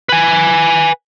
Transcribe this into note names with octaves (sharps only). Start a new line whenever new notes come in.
B4 G#5